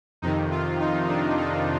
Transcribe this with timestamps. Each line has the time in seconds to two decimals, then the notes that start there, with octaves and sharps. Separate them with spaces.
0.22 F2 C3 D#3 D#4
0.51 F4
0.80 D#4
1.08 D4
1.38 D#4